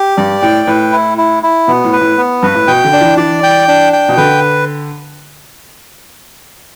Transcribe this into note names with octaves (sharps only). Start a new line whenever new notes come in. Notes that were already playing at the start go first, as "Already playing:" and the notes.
Already playing: G4
G2 D5
A2 G5
A2 B4
E4
E4
E4
B2 B3
A2
B4
A2
B3
G2 B4
A2
B2 G5
D3
D4
E3
E3 D5
G5
D4
G5
B2
D3 B4